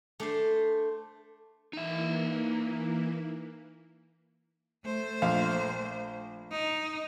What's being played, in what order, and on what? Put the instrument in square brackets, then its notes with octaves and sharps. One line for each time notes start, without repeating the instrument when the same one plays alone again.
[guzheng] A3 D4 C5
[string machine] E3 A#3 E4 [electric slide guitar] D#4 E5
[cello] A3 C5
[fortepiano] A#1 F5
[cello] D#4